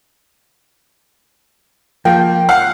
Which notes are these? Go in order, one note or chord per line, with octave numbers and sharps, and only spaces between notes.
F3 A#3 G5
F5 F#5